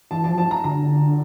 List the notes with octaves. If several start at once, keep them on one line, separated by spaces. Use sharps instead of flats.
E3 A5
A5
F3
A5
A#5
D3 A#5